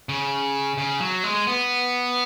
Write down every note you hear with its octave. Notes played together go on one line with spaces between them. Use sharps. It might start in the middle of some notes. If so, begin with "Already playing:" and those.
C#3
C#3
F#3
G#3
B3